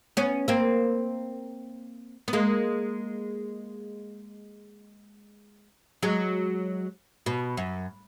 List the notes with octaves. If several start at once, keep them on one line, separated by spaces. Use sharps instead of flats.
B3 C#4
A#3 C4
B3
G#3 A#3
F#3 G#3
B2
F#2